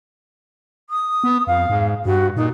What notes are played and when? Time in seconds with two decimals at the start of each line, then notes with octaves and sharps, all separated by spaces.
0.90 D#6
1.24 B3
1.47 F2 F5
1.69 G#2
2.06 G2 F#4
2.36 A#2 D#4